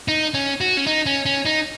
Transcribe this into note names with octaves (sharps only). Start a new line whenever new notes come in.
D#4
C#4
F#4
C#4
D#4
C#4
C#4
D#4